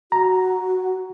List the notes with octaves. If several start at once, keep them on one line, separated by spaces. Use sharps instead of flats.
F#4 A#5